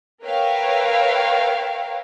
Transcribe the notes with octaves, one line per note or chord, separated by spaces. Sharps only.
A#4 B4 C#5 E5 F5 G5